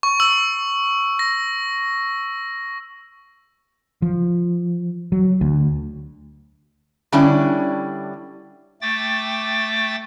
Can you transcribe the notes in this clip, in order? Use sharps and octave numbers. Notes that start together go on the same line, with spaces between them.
C#6
E6
A#6
F3
F#3
D2
D3 G3 C#4 D4 E4
A3 G5 D6 A6